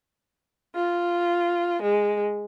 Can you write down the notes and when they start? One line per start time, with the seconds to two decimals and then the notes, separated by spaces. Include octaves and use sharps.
0.75 F4
1.82 G#3